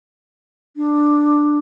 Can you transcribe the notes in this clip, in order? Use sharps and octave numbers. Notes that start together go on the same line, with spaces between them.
D4